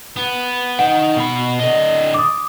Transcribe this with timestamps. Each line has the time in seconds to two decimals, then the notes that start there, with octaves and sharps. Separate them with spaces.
0.16 B3
0.79 D#4 F#5 G5
1.16 B2 B5
1.59 D3 D#5
2.14 D6 D#6